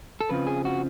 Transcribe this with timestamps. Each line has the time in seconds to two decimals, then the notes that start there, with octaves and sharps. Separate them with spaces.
0.21 A4
0.29 F2 C#3 F3 B4
0.47 G#4
0.65 F#4